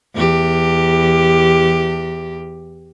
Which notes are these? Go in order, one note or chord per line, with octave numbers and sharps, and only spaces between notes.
E2 G4